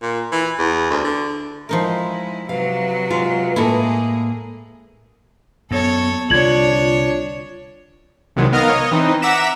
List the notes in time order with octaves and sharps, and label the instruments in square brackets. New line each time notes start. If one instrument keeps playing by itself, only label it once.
[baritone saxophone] A#2
E3
E2
D2
D3
[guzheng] F3 D#4 A#4 [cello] G#3 E4
[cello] C3 F#3 [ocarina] B4 [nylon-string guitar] F5
[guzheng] G#3 [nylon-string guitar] F4
[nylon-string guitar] A2 A#3 [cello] G#3 G#4 [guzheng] E4 A4
[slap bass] F#2 [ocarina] B3 [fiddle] A4 C#5
[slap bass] C2 D3 [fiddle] D4 C#5 [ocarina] F4 [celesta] G#6 F#7
[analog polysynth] C2 C3 D#3 F#3 G#3
D#3 B3 A#4 D#5 F5 F6
C#5 D#5
E3 C4 D#4
E5 F#5 A#5 D6 B6 E7